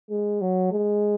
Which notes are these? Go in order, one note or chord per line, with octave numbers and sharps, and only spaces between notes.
G#3
F#3
G#3